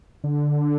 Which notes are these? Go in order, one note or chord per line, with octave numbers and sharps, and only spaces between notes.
D3